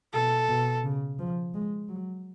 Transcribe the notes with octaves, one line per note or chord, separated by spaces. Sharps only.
B2 A4
B2
C#3
F3
G#3
F#3